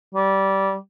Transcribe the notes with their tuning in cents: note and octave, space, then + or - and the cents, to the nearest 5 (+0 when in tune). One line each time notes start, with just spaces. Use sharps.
G3 -15